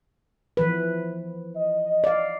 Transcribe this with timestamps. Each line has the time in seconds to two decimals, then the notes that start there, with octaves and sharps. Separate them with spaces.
0.57 E3 F3 B4
1.57 D#5
2.04 D5 F5